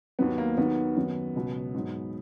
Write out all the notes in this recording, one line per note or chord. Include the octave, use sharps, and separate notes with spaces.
D#2 D#3 F#3 B3
A#3
D#2 D#3 F#3 B3
F#2 D#3 F#3
C#2 B2 F#3
G#2 F#3